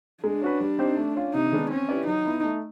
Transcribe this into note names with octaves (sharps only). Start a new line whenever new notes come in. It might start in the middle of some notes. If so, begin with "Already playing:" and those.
G#3 D4
C#4 F#4 B4
G3
C4 D#4 G4 C5
A3
C#4 F4
C3 D#4
D#3 G#3 B3 D4
C4 C#4
E4 G4 B4 D5
F#3 D#4
B3 E4
A3